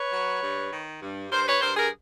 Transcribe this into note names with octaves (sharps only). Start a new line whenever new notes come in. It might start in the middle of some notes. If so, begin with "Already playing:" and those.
Already playing: B4 C#5
F#3
G2
D#3
G2
G2 A#4 C5
B4 C#5
G2 A#4 C5
G#4 A#4